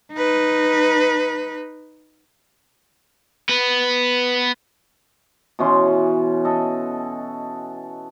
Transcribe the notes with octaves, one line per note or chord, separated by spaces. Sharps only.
D#4 B4
B3 B4
B2 E3 C#4 C6
A4 D#5